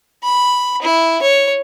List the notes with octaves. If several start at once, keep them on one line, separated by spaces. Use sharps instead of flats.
B5
E4
C#5